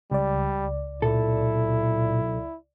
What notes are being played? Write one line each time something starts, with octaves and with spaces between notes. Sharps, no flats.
C#2 G3 D5
B1 A#2 E4 A4